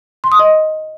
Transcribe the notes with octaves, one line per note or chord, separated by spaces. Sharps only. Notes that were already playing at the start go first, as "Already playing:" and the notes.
C6
D#6
D#5